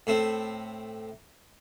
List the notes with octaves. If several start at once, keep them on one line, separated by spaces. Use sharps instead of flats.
A2 A3 C4